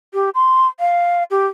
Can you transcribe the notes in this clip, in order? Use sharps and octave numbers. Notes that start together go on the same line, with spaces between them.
G4
C6
F5
G4